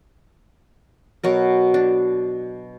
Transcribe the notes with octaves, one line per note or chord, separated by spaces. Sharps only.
B2 F#3 A#4
D4